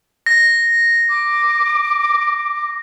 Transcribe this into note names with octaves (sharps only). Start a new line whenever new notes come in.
A#6
D6